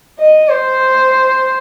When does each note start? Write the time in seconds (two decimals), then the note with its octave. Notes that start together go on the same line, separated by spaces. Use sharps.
0.19 D#5
0.49 C5